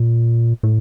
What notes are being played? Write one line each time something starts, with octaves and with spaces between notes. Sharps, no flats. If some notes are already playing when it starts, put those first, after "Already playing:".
Already playing: A#2
A2